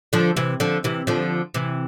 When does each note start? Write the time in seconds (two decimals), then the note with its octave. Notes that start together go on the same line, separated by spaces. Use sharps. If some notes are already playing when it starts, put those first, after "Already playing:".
0.13 D3 F3
0.37 C3 E3
0.60 D3 F3
0.84 C3 E3
1.07 D3 F3
1.54 C3 E3